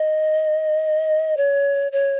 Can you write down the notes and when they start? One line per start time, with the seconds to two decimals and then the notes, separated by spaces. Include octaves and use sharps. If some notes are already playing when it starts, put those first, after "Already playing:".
Already playing: D#5
1.37 C#5
1.92 C#5